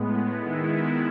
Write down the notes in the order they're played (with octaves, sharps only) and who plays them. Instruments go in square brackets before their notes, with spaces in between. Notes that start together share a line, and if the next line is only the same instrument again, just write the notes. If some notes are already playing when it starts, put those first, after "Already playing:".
Already playing: [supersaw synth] A2 G#3 B3
D#3 G#3 B3 E4